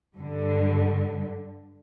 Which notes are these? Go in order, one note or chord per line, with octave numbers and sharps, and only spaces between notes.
G2 D3